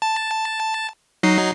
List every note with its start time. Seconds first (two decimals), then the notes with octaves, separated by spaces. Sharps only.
0.02 A5
1.23 F#3 D#4 C7